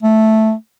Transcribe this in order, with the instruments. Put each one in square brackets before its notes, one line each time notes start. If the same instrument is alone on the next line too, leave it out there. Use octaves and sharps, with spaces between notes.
[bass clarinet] A3